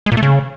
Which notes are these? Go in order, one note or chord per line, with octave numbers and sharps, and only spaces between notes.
G#3
A#2
A3
C#3